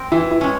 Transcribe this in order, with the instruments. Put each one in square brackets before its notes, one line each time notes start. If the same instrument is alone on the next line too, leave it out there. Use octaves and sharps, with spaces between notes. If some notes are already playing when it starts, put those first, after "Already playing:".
Already playing: [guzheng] C4 A#4
[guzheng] E3 [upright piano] E4
[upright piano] E4
[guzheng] G#3 C#4